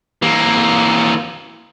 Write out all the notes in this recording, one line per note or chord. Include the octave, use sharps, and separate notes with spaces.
E3 A#3